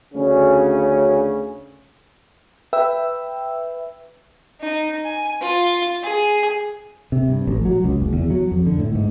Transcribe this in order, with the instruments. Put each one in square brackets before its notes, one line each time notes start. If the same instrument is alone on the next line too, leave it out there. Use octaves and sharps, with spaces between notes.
[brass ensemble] D2 C#3 C#4
[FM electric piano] B4 E5 G5 E6
[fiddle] D#4
G#5
F4
G#4
[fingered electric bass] C3
G2
A1
F#3
C#2
F#1
E2
F#3
F2
D3
A2
G#2